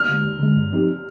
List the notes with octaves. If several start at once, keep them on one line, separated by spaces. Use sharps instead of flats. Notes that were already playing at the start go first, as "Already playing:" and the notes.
Already playing: F6
D3 G#3
D2
D3 G#3
G2
F3 C4 D#4 G4